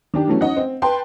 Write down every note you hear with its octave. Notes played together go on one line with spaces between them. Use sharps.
D#3 D4 G4
E3 F#3 A3 C#4
C#4 D#4 D#5 F#5
C4
B4 G5 A5 C6